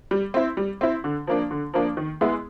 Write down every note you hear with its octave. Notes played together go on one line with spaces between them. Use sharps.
G3
C4 E4
G3
C4 E4
D3
F3 A#3 D4
D3
F3 A#3 D4
D#3
G#3 B3 E4